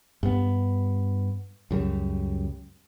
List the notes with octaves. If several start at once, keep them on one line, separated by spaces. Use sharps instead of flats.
G2 B3
C#2 F#2 G3